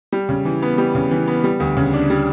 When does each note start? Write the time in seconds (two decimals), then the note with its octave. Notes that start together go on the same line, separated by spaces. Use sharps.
0.12 G3
0.29 C#3
0.45 E3
0.62 B3
0.78 G3
0.95 C#3
1.11 E3
1.28 B3
1.44 G3
1.60 D2
1.77 C#3
1.93 D4
2.10 G3